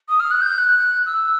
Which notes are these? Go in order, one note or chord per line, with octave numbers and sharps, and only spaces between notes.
D#6
F6
F#6
G6
F#6
E6